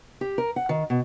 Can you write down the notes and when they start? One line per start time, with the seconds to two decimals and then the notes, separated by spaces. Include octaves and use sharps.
0.21 G4
0.38 A#4
0.56 F#5
0.69 D#3
0.90 B2